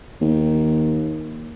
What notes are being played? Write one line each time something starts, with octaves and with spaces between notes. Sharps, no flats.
D#2